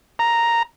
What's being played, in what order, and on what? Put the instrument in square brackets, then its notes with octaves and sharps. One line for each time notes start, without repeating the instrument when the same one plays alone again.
[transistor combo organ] A#5